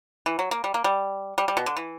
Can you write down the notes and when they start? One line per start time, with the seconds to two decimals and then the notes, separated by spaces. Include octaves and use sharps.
0.26 E3
0.39 F#3
0.51 A#3
0.64 G3
0.74 A#3
0.84 G3
1.38 G3
1.48 G3
1.57 B2
1.66 D3
1.77 E3